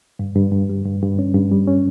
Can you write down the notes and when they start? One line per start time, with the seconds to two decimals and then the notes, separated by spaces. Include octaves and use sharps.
0.19 G2
0.36 G2
0.52 G2
0.69 G3
0.85 G2
1.02 G2
1.19 C#4
1.34 G2
1.51 G3
1.67 C#4